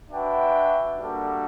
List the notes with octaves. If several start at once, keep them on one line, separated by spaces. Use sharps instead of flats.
D4 F#4 B4 E5 G5
G3 A#3 D4 F#4 A4